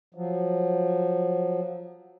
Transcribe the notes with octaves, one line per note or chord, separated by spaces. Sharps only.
F3 F#3